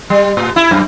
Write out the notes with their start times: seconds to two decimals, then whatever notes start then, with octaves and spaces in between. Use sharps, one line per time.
0.10 G3
0.37 A2
0.56 E4
0.71 F#2